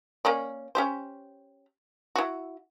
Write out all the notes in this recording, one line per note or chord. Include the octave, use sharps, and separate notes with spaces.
A#3 C#4 D5
C#4 G4 C5
E4 F#4